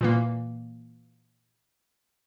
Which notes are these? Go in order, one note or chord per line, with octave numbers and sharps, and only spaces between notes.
A#2 E3 A#3